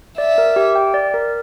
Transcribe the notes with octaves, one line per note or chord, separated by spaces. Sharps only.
D5 E5
A#4
G4
G5
D5
A#4